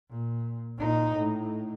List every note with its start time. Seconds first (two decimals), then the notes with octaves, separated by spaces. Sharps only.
0.10 A#2
0.78 A#2 D#4
1.17 A2